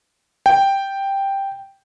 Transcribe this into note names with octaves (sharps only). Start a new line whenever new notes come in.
G5